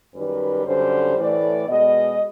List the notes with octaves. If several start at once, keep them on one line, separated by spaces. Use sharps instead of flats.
F#2 D#3 G3 B4
F#2 D3 G3 C5
A2 E3 A3 D5
B2 G#3 B3 D#5